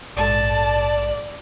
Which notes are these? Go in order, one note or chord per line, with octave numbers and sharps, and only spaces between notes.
A#1 G#2 A4 D5 A5